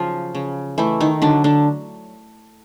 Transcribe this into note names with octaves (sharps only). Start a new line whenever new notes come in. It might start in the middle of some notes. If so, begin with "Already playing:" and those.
Already playing: C#3 F3 F#3 F4
C#3
E3 A3 E4
D#3 D#4
D3 F#3 D4
D3 D4